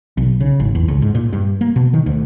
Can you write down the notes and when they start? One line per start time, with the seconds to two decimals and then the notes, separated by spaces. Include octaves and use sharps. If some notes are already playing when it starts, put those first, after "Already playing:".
0.17 B1
0.40 C#3
0.60 G#1
0.75 E2
0.88 C#2
1.02 G#2
1.15 A#2
1.33 G2
1.61 A#3
1.76 B2
1.93 D#3
2.06 D2